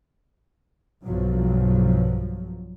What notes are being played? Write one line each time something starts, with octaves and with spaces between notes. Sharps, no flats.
B1 G2 F3 F#3